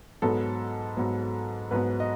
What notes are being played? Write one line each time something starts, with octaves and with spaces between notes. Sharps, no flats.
G#2 F#3 B3 A4
G#2 F#3 B3
G#2 F#3 B3 B4
D#5